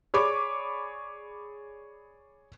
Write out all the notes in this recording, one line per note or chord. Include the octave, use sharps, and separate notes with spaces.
G#4 C#5 D5 B5 C#6 D6